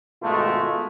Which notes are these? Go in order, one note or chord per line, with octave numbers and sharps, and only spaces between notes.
G#1 B2 G#3 A3 F4